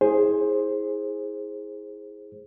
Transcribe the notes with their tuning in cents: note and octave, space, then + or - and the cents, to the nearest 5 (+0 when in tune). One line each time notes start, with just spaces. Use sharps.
E4 -35 G#4 +0 C5 +15